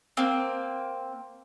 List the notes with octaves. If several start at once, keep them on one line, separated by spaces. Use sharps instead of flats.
A#3 C4